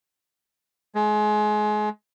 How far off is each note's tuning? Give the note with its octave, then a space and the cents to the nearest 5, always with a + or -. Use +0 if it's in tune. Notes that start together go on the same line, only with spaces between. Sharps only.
G#3 +30